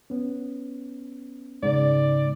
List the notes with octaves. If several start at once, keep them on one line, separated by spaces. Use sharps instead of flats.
B3 C#4
G#2 C#3 D5